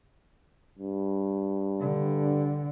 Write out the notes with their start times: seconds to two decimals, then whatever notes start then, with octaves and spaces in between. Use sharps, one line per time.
0.78 G2
1.80 D3